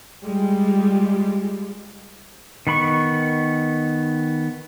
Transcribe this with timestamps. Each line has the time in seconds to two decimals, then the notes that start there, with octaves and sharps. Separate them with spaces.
0.26 G3 G#3 F4 G4
2.67 D#3 B3 B5 C#6